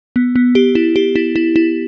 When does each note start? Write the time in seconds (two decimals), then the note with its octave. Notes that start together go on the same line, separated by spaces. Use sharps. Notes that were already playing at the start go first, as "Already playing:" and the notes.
0.16 B3
0.36 B3
0.55 G4
0.75 E4
0.96 G4
1.16 E4
1.36 E4
1.56 E4